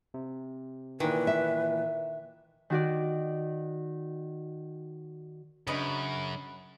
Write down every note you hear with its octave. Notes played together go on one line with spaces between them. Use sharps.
C3
A#2 D#3 E3 B4
E5
D#3 F#4 D5
F#2 C#3 D4 B4 D#5 B5